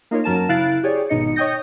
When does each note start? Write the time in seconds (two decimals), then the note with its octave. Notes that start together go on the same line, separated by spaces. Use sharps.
0.11 A#3 D#4 F4 A#4 C#5
0.24 F#2 F#3 A#4 A5 E7
0.49 C#3 E4 F5 F#6 A6 D7
0.83 G4 G#4 C#5 D5
1.09 G#1 B2 D#4 D#5 C#7
1.36 C#5 D#5 G5 D#6 G6 A#6